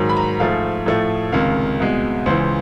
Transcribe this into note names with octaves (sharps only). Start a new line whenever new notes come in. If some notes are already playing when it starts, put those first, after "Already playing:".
Already playing: G#2 D#3 F#3
B5
A#5
G#2 F3 A3 F5
A2 F3 A3
C#2 C3 D#3 F5
C2 B2 G#3
C#2 C#3 E3 C5